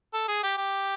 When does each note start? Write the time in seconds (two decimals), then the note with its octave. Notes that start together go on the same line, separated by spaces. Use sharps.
0.14 A4
0.28 G#4
0.44 G4
0.58 G4